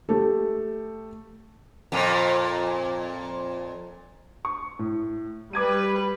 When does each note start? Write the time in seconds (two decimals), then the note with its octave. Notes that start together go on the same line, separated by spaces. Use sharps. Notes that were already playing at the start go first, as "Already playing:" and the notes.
0.09 A3 G4 A4
1.92 F2 A#2
4.45 C#6
4.79 A2
5.53 G3 B4 D6 G#6 D#7